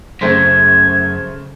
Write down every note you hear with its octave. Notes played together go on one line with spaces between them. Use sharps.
F#2 C#3 A3 C5 G#6